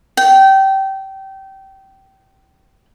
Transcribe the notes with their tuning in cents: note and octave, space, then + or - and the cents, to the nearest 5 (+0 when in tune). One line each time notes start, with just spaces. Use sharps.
G5 -20